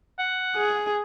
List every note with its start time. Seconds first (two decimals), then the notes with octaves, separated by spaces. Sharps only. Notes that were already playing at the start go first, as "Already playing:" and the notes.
0.19 F#5
0.56 G#4